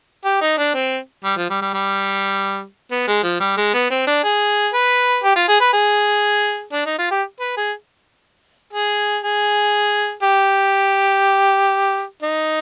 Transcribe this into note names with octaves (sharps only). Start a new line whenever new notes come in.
G4
D#4
D4
C4
G3
F3
G3
G3
G3
B3
G#3
F3
G3
G#3
B3
C4
D4
G#4
B4
G4
F4
G#4
B4
G#4
D4
D#4
F4
G4
B4
G#4
G#4
G#4
G4
D#4